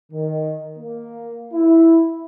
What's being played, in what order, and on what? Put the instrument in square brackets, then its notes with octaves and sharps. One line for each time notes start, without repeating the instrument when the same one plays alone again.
[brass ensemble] D#3
A#3
E4